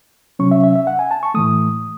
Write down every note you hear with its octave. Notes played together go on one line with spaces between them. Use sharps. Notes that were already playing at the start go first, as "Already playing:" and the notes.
C3 F#3 C#4 C#6
E5
E5
E5
F#5
G#5
A5
C#6
A2 E3 A3 D#6